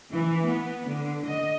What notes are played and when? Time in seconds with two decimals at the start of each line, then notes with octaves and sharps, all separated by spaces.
0.12 E3
0.45 B3
0.87 D3
1.25 D#5